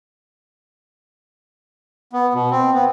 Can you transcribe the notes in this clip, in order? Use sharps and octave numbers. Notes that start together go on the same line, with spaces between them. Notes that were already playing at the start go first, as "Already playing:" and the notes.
B3
B2
C4
B3